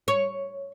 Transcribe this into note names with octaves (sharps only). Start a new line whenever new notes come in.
C#5